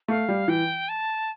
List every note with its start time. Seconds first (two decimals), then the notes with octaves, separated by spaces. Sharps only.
0.08 A3 F5
0.29 G3
0.48 E3 G5
0.89 A5